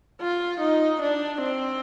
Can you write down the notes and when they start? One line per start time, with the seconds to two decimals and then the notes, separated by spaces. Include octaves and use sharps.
0.21 F4
0.60 D#4
1.02 D4
1.41 C4